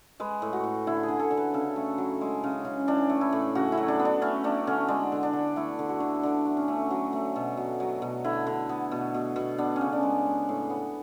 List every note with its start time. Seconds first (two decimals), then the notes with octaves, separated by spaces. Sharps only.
0.20 G#3 B4
0.42 A2
0.53 F#4
0.64 A2
0.87 D3 E4
1.03 G#4
1.08 D3
1.19 A4
1.31 D3
1.37 B4
1.54 C#3 A4
1.76 A3
1.98 F#3
2.21 G#3
2.44 C#3
2.65 C#3
2.88 E3 D4
3.10 A3
3.21 E4
3.32 A2
3.55 C#3 F#4
3.72 E4
3.77 F#3
3.88 D4
3.99 B3
4.05 D4
4.22 A3 C#4
4.44 A3 D4
4.67 D3 C#4
4.88 G#3 D4
5.12 D3
5.23 D4
5.33 D3
5.56 A3 E4
5.79 D3
5.89 F#4
6.00 D3
6.23 D3 D4
6.45 A3
6.57 C#4
6.68 A3
6.91 F#3
7.13 A3
7.36 B2
7.57 B2
7.80 F#3
8.02 B2
8.24 D3 E4
8.47 D3
8.69 B3
8.91 B2
9.14 B2
9.36 B2
9.58 B3 D4
9.76 C#4
9.81 C#3
9.93 D4
10.03 G#3
10.26 G#3
10.49 A2
10.70 B3